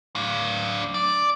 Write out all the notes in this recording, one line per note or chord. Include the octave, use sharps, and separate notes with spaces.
D4 F5
D5